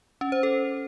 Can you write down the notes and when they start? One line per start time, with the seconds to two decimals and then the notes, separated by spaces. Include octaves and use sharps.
0.21 C#4
0.32 C5
0.43 A4